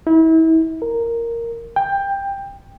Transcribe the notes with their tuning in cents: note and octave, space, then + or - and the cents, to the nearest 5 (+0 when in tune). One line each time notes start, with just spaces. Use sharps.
E4 -35
A#4 -5
G5 +15